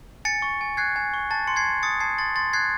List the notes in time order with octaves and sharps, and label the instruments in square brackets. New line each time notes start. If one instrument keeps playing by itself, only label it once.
[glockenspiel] G#5 A6 C#7
C#6
G#5
F#6 G#6 C7
G#5
C#6
A5 A6
C6 C#7
G#6 C7
A5
D#6 A6 C#7
A5 G#6 C7
C6 A6
C6 A6
F#6 G#6 C7